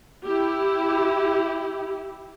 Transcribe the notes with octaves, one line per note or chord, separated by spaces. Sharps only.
E4 G4